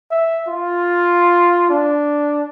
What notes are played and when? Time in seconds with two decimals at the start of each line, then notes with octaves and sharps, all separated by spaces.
0.11 E5
0.48 F4
1.70 D4